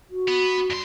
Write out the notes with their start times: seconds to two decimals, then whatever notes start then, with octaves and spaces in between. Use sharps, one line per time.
0.10 F#4
0.28 B3
0.70 G2 C6